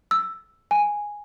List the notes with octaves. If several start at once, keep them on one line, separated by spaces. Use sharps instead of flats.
E6
G#5